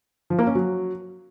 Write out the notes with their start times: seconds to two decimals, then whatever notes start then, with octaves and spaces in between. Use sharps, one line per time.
0.30 F3
0.39 A#3
0.47 C#4
0.55 F#3